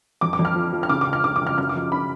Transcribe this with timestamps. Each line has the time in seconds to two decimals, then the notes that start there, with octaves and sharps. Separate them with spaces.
0.21 F2 D6
0.33 D6
0.39 F2
0.45 F6
0.56 F3
0.73 F3
0.83 F6
0.89 C#3 D6
1.01 D6
1.07 C#2
1.13 F6
1.24 C#2 D6
1.36 D6
1.41 C#2
1.47 F6
1.58 F#2 F6
1.69 D6
1.75 F3
1.92 C#3 B5